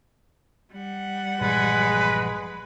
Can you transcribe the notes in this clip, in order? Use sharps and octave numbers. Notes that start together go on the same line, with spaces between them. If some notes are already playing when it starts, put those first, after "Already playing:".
G3 F#5
A#1 G2 E3 G#3 B4